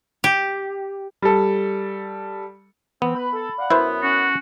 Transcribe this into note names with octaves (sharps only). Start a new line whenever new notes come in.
G4
G3 A4
E3 B3 C4
B4 B5
A4
D5 F5 F#5
F#2 B3 E4 B4 C5
C#4 F#4